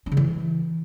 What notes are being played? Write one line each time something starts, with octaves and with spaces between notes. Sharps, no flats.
D4
C#3
E3